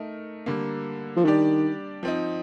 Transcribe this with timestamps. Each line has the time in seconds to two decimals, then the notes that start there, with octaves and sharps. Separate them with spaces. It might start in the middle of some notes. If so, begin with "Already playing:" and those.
Already playing: A3 D#4 A#4
0.46 D3 G3 A#3
1.16 F3
1.25 D#3 G3 D4 G4 D5
2.03 F3 C4 D#4